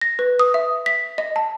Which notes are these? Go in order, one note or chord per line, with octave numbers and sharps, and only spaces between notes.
A#6
B4
D#6
E5
B6
D#5
A5